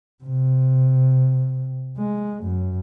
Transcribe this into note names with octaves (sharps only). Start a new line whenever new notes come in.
C3
G#3
F#2